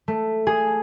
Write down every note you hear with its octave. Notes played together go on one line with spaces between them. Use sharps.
A3
G#4